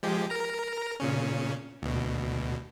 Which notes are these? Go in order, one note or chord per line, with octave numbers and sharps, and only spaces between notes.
F3 G#3 G4
A#4 A#5
A#2 C#3 C#4
D2 B2